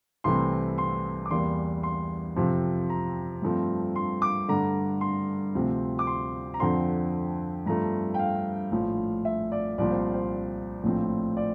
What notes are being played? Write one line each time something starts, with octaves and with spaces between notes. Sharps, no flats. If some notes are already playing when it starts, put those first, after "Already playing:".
C2 C3 E3 A3 C4 C6
C6
D6
E2 E3 G3 A#3 C6
C6
F2 C3 F3 C4
A#5
G2 F3 A3 C4
C6
D6
G2 D3 A3 A#5
C6
D2 C3 F3 C4
D6
C6
A#5
F2 D3 F3 C4 C6
G2 F3 A3 C4 A#5
G5
F5
A#1 A2 F3
E5
D5
C2 A#2 F3 C4 D5
C5
C5
A#1 A2 F3 C4
D5